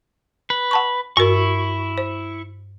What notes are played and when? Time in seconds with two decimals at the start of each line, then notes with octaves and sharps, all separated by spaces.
0.50 B4
0.71 F#5 A5 C#6
1.17 G2 E4 F#4 A#4 C#6
1.98 C5